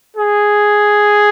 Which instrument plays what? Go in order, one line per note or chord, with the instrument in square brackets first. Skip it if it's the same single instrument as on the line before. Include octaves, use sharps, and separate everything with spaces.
[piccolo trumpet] G#4